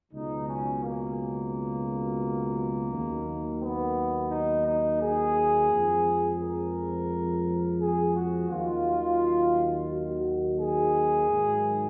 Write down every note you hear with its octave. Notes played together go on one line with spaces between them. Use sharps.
C#2 B2 F#3 D#4
C#4
A#3
D#2 D#3 F#3
B3
D#4
D#4
G#4
F2 F3 G#3
A#4
G#4
F#4
D#2 D#3 F#3 F4
F#4
G#4
G#2 D#3 F#3